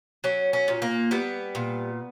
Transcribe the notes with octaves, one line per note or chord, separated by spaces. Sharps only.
F#3 C#4
C#4
A#2
A#3
G3 B3
A#2